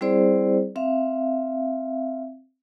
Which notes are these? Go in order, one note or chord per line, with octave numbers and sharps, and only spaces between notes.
G3 C4 E4 G#4 C5 D5
C4 E5 F5